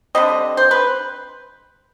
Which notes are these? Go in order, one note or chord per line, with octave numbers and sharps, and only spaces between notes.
D3 G3 C4 D#5
C5
B4